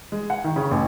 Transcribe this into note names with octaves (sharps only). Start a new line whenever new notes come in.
G#3
F#5
D#3
C#3
A1